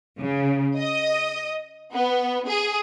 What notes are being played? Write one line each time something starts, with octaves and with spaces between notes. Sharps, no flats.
C#3
D#5
B3
G#4